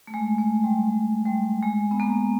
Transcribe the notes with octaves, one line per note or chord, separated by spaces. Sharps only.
A3
G#3
A3
G3
G3
G3
G#3
B3
A#3